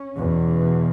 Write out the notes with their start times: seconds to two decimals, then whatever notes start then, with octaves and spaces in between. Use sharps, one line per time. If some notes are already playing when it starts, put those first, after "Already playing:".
Already playing: C#4
0.15 E2 B2